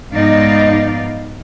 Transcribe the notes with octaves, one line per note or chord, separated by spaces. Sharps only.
G#2 F3 B3 D#4 D5 F5